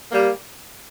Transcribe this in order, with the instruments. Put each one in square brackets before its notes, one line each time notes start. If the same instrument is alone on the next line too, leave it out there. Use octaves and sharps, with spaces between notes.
[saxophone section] G3 A#3